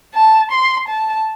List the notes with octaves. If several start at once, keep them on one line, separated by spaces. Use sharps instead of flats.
A5
C6
A5